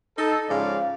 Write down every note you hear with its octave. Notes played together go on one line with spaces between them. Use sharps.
D#4 A4
G#2 C#3 F3 D5 F5